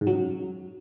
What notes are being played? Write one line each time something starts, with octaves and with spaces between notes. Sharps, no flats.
G#2
F#3
F#2